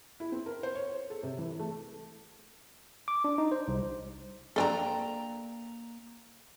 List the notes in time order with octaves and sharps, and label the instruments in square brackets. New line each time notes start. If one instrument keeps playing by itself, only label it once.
[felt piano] E4
C4
A#4
C5
C#5
A4
C3
E3
A3
[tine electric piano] D6
D4
D#4
C5
C2
[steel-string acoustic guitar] A#3 G#5 A#5 [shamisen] C4 D4 A4